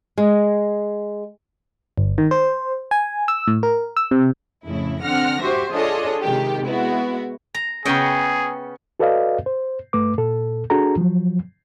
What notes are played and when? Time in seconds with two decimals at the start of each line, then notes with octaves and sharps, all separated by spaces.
0.18 G#3
1.98 G1
2.18 D#3
2.31 C5
2.91 G#5
3.28 E6
3.48 A2
3.63 A#4
3.97 E6
4.11 C3
4.64 F2 A2 C#3 E4
5.03 D3 C4 F#5 F6 A#6
5.41 F#4 G4 C5 E5
5.72 D4 F4 G#4 A4 C#5 D#5
6.23 C3 D#3 G#3 G4
6.65 G#3 B3 E4 F#4
7.54 A#5
7.85 C#3 B3 C#4 G#4 D#5 G5
9.00 F#4 A4 B4 D5 D#5 F5
9.46 C5
9.93 G2 A3 B4 D6
10.18 A#2 A4
10.70 D4 F#4 G#4 A4 A#5
10.97 F3 F#3